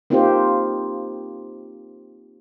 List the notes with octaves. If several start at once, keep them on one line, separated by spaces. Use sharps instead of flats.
A#3 C4 D#4 F4 G4 C5